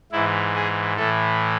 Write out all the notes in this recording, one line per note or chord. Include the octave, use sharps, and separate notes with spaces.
G#2 E3 E4
G#4
A2 E3 A4